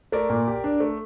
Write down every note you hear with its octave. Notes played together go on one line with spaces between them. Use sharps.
A3 A#4 D5
A#2
G4
D4
A3